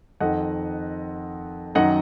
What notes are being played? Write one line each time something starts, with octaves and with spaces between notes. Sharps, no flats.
F2 D#3 D#5 F#5
F#2 D#3 D#5 F#5